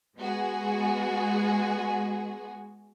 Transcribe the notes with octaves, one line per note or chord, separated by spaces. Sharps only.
G#3 B3 F#4 G#4